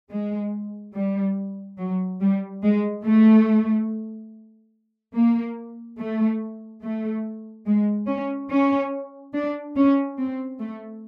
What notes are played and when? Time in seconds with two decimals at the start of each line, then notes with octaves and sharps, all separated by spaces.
0.10 G#3
0.95 G3
1.78 F#3
2.21 G3
2.63 G#3
3.04 A3
5.14 A#3
5.98 A3
6.82 A3
7.66 G#3
8.07 C#4
8.50 C#4
9.34 D4
9.76 C#4
10.18 C4
10.59 A3